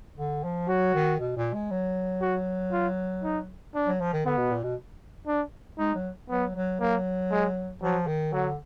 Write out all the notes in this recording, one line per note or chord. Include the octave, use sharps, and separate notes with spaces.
D3
F3
F#3 F#4
D#3
B2
A#2
G#3
F#3
F#4
F4
D#4
D4
F#3
F3
D#3
D3 B3
B2
A#2
B2
D4
G#3 D#4
F#3
F#3 B3
F#3
F#3 A#3
G#3
F3 F#3
D#3
D3 F#3